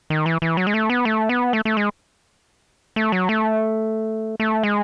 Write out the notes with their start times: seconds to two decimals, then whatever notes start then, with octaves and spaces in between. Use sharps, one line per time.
0.10 D#3
0.26 E3
0.42 E3
0.57 F#3
0.67 G#3
0.74 A3
0.90 B3
1.05 A3
1.29 B3
1.53 A3
1.65 A3
1.77 G#3
2.96 A3
3.12 F#3
3.29 A3
4.40 A3
4.63 G#3